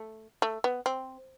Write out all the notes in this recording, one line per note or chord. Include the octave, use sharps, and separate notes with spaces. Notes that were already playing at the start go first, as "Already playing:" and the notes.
Already playing: A3
A3
B3
C4